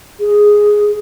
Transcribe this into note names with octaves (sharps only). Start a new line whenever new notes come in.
G#4